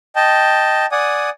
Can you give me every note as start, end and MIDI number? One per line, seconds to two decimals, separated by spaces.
0.16 0.86 75
0.16 0.86 79
0.16 0.86 81
0.92 1.30 74
0.92 1.30 78
0.92 1.30 80
0.92 1.30 87